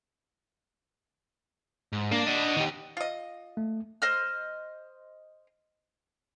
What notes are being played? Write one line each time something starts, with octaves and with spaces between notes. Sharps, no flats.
G#2
A#3 D4
D#5 F#5
D#3 G4
F4 D#5
A3
C5 D#5 F6